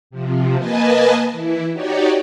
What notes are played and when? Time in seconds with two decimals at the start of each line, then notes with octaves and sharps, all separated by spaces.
0.10 C3 F3
0.57 A#3 B4 D#5 G#5 A5
1.31 E3 E4
1.72 D#4 F#4 G4 C#5 D5